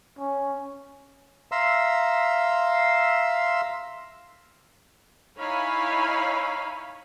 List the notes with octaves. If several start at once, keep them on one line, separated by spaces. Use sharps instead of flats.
C#4
E5 F5 A#5 C6 E6
D#4 E4 C#5 F5 G#5 B5